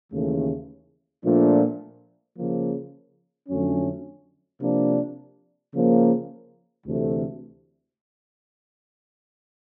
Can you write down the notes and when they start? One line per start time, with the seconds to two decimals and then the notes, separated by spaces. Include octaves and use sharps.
0.11 D#2 C#3 E3 A3
1.25 A#2 F3 A3 D4
2.36 C#3 F3 A#3
3.48 F2 D3 F#3 A3 C#4
4.61 C3 F3 A#3 D4
5.73 C#3 F3 A#3
6.86 D2 C3 E3 A3